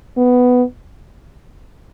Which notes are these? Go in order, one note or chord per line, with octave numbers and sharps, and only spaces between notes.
B3